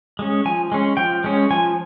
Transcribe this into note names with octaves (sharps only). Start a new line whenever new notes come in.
G#3 C#4
F3 G#5
G#3 C#4
F3 G5
G#3 C#4
F3 G#5